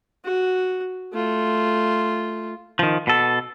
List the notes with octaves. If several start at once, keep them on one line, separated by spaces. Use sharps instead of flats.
F#4
A3 F4
D#3 F3
B2 A4